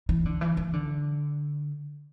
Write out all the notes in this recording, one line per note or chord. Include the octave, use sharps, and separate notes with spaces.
E3
D3
E3
E3
D3